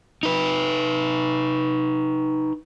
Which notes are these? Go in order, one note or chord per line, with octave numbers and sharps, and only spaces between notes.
D#4 B4